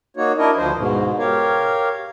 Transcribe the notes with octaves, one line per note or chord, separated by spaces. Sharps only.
A#3 D#4 F#4 C#5
D4 E4 A#4 D#5
D2 F3 C5
G#2 B2
G4 A#4 C#5 F5